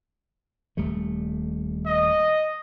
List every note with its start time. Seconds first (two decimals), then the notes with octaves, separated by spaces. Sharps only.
0.77 D#1 G3 A3
1.86 D#5